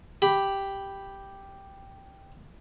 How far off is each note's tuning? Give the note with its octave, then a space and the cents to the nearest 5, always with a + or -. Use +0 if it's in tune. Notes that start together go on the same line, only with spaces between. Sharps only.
G4 +0 B5 +0